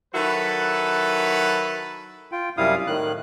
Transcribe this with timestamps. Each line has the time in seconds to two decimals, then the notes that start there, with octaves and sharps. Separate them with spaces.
0.14 D#3 F#3 E4 F#4 A4 B4
2.32 F4 G5
2.57 F#2 C3 G3 E4 F5 D#6
2.87 A2 D#3 F#6